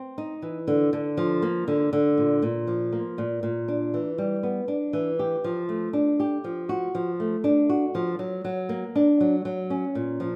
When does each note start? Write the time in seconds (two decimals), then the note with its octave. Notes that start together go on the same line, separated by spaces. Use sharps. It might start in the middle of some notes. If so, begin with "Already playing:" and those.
Already playing: C4
0.18 D#4
0.42 E3
0.68 D3
0.93 D3
1.17 F3
1.42 A#3
1.68 D3
1.93 D3
2.18 A#2
2.42 A#2
2.67 F3
2.92 A#3
3.18 A#2
3.43 A#2
3.68 D4
3.94 E3
4.18 G3
4.43 B3
4.68 D4
4.93 E3
5.19 G4
5.44 F3
5.69 A3
5.93 D4
6.20 G4
6.44 F3
6.69 F#4
6.95 F3
7.20 A3
7.44 D4
7.70 F#4
7.95 F3
8.19 F#3
8.45 F#3
8.69 A#3
8.96 D4
9.21 F#3
9.45 F#3
9.70 C#4
9.95 A#2
10.20 F3